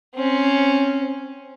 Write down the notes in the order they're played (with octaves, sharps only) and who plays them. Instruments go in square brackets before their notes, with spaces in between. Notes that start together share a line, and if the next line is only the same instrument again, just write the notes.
[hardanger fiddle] C4 C#4